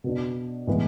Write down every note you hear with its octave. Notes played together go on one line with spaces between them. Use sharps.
B2 B3 D4
A2 E3 G#3 B3